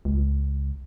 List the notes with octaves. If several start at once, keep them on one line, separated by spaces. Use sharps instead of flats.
C#2